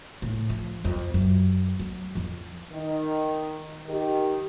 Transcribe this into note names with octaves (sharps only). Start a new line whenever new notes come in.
A2
F3
F2
F#2
F#3
F2
D#3
D#3 G4